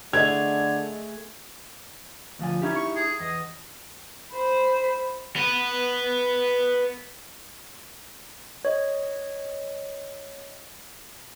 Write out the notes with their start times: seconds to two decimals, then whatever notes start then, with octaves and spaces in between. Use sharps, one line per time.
0.13 D3 A3 G#4 D#5 G#6 F7
2.39 D2 F3 G#5
2.62 C#4 D#4 E4 G4
2.75 C#6
2.95 G#4
3.20 E2 D#5
4.33 C5 B5
5.36 B3 B4
8.65 C#5 D#5